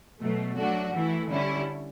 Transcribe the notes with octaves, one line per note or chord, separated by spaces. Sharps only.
B2 F#3 A3
F#3 A3 D4 F#4
E3 A3 E4
D3 G3 C#4 E4